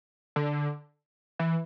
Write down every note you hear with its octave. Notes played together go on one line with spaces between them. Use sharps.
D3
E3